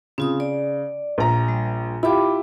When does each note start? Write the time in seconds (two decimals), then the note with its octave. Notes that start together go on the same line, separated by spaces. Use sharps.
0.18 C#3 C4 F4 D#6
0.40 D5
1.18 A#1 A#5
1.49 G3
2.03 E4 F4 G4 B5 D6